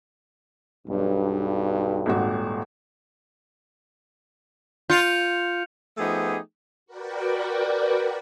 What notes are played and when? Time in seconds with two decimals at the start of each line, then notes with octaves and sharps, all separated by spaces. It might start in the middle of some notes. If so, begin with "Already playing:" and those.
0.87 B1 G2
2.06 D#1 G#1 F#4
4.90 F4 G6 C#7 F7
5.98 F3 A3 B3 D#4 G4 G#4
6.86 F#4 A#4 B4 D5 G5